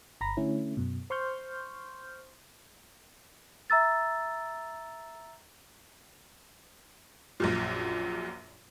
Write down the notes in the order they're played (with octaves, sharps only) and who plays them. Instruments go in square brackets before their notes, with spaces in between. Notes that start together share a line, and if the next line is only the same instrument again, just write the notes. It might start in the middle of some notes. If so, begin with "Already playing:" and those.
[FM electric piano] G1 A#5 B5 A#6
D3 A3 C#4 E4
F#2 B2
C5 C6 C#6 F6 G6
[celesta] E5 A#5 E6 A6
[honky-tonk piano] A#1 F#2 A#2